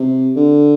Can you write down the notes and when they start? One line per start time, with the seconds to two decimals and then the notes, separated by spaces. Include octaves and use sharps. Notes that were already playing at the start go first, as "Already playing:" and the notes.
Already playing: C3
0.36 D3